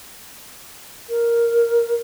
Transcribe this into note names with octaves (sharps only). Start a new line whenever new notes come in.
A#4